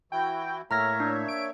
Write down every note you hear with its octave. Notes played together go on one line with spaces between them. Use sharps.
E3 E4 F#4 G5
A2 A#3 C#5 E5 A#5 F6 A#6
D4
D7